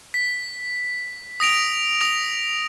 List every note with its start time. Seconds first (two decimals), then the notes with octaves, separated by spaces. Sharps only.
0.14 B6
1.40 D#6 A#6 D7 F7
2.01 D#6 A#6 F7